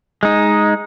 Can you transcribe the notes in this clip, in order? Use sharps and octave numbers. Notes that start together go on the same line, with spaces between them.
G#3 D#4